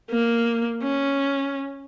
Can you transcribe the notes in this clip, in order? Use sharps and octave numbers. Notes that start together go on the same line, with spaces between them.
A#3
C#4